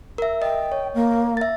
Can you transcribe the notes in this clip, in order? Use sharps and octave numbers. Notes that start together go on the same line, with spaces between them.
A#4 E5
D#5 G5
C#5
A#3
E5 A6